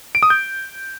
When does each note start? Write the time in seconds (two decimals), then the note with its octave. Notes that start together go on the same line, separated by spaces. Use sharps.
0.15 D7
0.23 D#6
0.30 G6